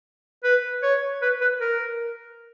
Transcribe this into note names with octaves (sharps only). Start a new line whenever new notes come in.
B4
C#5
B4
B4
A#4